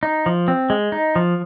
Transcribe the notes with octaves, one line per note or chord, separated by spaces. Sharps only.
D#4
F3
C4
G#3
D#4
F3